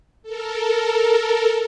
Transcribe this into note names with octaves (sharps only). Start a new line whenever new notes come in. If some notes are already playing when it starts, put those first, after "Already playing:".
A4 A#4